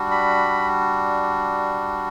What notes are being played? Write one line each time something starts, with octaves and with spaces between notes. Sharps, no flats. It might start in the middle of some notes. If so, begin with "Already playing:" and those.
Already playing: G3 D4 F#4
B5